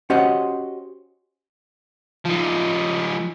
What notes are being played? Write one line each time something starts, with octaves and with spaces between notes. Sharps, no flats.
C#4 F#4 G4 C5 D#5 F#5
F3 D#4